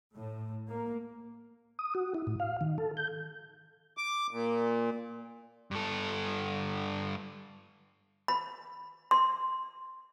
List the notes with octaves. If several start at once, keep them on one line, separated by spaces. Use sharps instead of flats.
A2
A#3
D#6
F#4
E4
A2
F5
D#3
A4
G6
D6
A#2
G2 A4
B5
C6